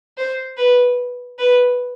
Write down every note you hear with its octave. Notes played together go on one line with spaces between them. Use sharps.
C5
B4
B4